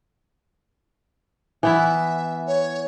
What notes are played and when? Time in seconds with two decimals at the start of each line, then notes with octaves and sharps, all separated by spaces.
1.63 E3 B3 E4 E5
2.47 C#5